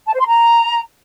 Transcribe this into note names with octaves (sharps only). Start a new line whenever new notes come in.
A5
C5
C6
A#5